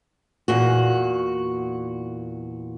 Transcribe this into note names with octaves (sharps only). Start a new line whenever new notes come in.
E2 A#2 F#4